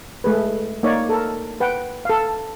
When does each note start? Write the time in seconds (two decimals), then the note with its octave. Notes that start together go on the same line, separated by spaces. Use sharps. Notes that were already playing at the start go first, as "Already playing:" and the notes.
0.24 G#3 A3 G#4 B4
0.83 A#3 D#4 C#5 D5
1.09 A4 A#4
1.60 B4 F#5 G5
2.05 A4 F5